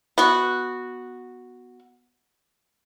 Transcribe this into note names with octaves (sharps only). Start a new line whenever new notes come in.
B3 F#4